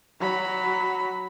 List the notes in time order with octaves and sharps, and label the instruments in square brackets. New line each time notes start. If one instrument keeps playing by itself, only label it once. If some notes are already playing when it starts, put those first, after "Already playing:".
[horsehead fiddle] F#3 B5